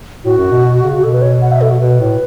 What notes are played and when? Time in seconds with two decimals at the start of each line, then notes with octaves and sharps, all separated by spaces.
0.24 A2 F#4
0.37 F#2
0.51 B2
0.63 B2
0.83 C#3
0.98 F#4
1.03 B2 A4
1.13 B4
1.22 C#5
1.42 F#5
1.52 E5
1.61 A4
1.71 F#4
1.81 B2 B4
2.00 A2